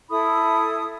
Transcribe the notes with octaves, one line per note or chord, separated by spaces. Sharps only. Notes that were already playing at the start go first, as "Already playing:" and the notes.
E4 A4 B5 D#6